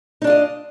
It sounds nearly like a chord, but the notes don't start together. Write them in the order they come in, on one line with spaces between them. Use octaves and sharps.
D#4 D4 F4 D#5